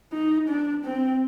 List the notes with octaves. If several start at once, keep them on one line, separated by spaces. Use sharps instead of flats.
D#4
D4
C4